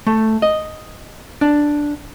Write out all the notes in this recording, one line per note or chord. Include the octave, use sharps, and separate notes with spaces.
A3
D#5
D4